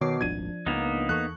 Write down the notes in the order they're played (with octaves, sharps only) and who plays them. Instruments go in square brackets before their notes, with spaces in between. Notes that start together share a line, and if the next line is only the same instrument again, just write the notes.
[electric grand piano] B2 [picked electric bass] D#3 [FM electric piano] C#5 D6 C7
[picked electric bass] D#1 G#1 [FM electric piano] F3 D4 [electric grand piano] G#6 D#7
[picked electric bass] C#2 [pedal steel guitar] A#3 B3 D#4
[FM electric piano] E2 A4 C#6 [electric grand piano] F#6